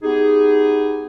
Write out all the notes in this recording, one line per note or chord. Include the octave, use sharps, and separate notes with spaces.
B3 D#4 G4 G#4